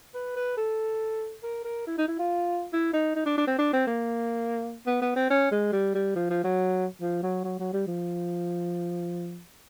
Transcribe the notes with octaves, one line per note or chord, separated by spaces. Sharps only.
B4
B4
A4
A#4
A#4
E4
D#4
E4
F4
E4
D#4
D#4
D4
D4
C4
D4
C4
A#3
B3
B3
C4
C#4
G#3
G3
G3
F3
F3
F#3
F3
F#3
F#3
F#3
G3
F3